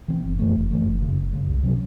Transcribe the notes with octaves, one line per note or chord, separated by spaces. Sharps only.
E3 C4
F#1
F#2 E3 A3
F#1
F#2 E3 A3
F#1
F#2 C#3 G#3
F#1
F#2 C#3 G#3
C2
C3 F#3 C#4